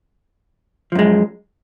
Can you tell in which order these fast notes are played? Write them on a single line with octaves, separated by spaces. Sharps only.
F3 F#2 G#3